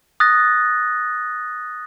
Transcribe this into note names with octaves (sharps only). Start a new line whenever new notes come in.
D#6 F#6 A6 A#6